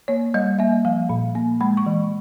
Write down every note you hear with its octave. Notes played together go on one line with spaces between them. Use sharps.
A#3 C#5
G3 D#5
A#3 E5
F3 F5
A#2
A#3
G#3 B5
C#6
E3